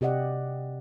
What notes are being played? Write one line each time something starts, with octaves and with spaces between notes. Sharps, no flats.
C3 G4 D5 D#5 F#5